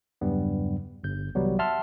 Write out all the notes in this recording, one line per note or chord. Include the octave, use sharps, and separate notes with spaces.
E2 G2 C#3 F#3 G3 B3
G1 G6
C2 E3 F#3 G3 B3
E5 F#5 A5 C6 F6